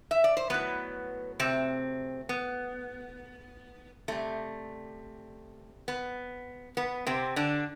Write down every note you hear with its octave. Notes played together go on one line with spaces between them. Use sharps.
E5
D5
C5
A2 F#3 B3 B4
C3 C4
B3
C3 G3 A3
B3
B3
C3 C4
D3 D4